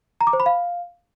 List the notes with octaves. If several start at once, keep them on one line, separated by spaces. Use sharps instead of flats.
A#5
D6
C5
B5
F5